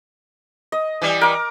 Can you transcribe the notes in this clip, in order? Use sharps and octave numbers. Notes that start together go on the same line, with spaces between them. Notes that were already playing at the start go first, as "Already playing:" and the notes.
D#5
E3 G3
A#4 D6